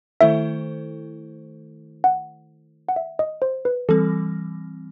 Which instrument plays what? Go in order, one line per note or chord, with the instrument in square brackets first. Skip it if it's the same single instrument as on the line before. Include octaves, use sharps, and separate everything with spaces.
[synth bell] D#3 A3 E4 A4 C5 [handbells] E5
[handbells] F#5
F#5
E5
D#5
C5
B4
[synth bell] E3 G3 C4 [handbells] A4